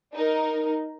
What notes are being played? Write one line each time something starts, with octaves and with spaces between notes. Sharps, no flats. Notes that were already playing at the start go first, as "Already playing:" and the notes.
D#4 A#4